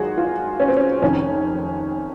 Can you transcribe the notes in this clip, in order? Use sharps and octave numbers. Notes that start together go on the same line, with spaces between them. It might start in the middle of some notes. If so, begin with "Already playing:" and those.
Already playing: G#1 F#2 F3 F#4 G#4
F4
C#4
C4
C#4
F1 F2 C3 D#3 C#4